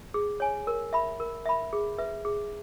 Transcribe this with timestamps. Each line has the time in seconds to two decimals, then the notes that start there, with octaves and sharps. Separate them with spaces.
0.14 G#4
0.40 C#5 G#5
0.67 A#4
0.93 E5 B5
1.20 A#4
1.46 E5 B5
1.73 G#4
1.98 B4 E5
2.25 G#4